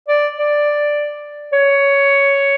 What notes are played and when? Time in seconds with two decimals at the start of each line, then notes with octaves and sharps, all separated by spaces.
0.08 D5
0.38 D5
1.53 C#5